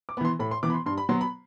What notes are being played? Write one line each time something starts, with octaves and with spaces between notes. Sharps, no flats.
D6
E3 B3 B5 C6
A2 B5
C6
E3 B3 D6
B5
C6
G2 C6
B5
F#3 B3 C6
B5